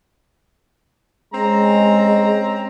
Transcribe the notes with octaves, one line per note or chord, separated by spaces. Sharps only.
G#3 C4 C#4 A#5